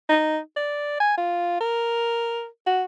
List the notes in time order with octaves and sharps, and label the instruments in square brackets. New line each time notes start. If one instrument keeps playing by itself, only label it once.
[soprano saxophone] D#4
D5
G#5
F4
A#4
F#4